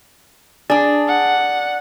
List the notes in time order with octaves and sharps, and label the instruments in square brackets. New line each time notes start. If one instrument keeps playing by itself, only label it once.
[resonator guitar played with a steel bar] D4 G#4 [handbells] D5
[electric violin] F#5